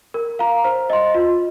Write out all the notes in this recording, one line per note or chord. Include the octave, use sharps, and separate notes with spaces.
A#4
F5 A#5
C5
D#5 C6
F4